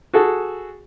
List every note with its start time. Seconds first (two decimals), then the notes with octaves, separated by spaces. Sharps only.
0.13 F#4 G#4 A4